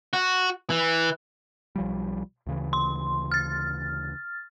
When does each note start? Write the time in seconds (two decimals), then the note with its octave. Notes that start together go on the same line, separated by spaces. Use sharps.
0.13 F#4
0.70 E3
1.76 B1 F3 G3
2.47 D2 C#3 E3
2.73 C6
3.32 F6 A6